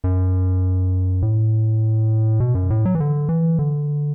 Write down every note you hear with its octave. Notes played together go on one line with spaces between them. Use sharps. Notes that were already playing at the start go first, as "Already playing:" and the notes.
F#2
A2
B2
F#2
A2
F#3
E3
D3
E3
D3